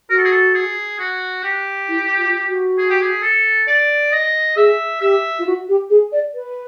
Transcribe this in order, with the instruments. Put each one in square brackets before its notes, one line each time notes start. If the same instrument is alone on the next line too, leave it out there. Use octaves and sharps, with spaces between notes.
[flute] F#4 [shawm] A#4
[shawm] A4
G#4
A4
G#4
F#4
G4
[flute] E4
F4
F#4
[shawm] G#4
G4
G#4
A4
D5
D#5
[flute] G#4 [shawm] E5
[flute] G4 [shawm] E5
[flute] F4
F#4
G4
G#4
D5
B4